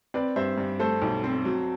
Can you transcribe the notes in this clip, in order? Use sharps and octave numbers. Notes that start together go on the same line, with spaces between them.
C4 B4 D5
G2 C5 E5
G2
A3 A4 C5
B1
C4
F#3